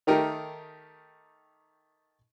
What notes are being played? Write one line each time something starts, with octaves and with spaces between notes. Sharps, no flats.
D#3 A3 D#4 G4 A#4